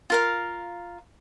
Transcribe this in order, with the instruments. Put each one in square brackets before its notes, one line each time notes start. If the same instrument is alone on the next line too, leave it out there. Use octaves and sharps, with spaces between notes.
[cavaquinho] F4 A#4 F5